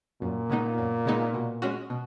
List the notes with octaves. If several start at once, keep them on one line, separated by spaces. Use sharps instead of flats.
F#2 A#2
C#3 G#3 B3 D#4
F#2
C#3 G#3 B3 D#4
B2
G#3 C#4 F#4
B2